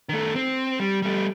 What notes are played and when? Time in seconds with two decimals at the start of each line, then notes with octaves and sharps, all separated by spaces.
0.09 D#3 A3
0.36 C4
0.80 G3
1.02 G3 A3